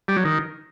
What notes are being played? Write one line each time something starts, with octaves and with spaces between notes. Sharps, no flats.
G3
F#3
D#3